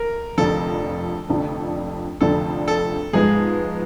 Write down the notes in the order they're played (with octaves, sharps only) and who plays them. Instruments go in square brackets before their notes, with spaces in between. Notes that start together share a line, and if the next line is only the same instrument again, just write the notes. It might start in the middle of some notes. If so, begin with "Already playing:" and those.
Already playing: [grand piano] A#4
[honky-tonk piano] F1 F2 D3 F3 [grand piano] A4
[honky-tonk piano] F1 F2 D3 F3
[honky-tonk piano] F1 F2 D3 F3 [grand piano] A4
[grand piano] A4
[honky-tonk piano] G#2 F3 G#3 B3 [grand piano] G#4